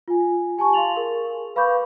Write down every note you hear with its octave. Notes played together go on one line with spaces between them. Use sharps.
F4 G#5
G4 G#5 A5 C#6
F5 C6 A6 F7 F#7
G#4 A#4
B4 F5 B5 C#6 D6 G6